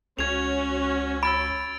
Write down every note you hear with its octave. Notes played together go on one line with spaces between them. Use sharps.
C#2 C#4 F#4 C#5 G#6 F7
B5 E6 A6 D7